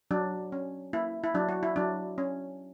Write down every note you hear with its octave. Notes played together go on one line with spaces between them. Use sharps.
F#3 D4
C#4
A#3 E4
E4
F#3 D4
F#4
E4
F#3 D4
C#4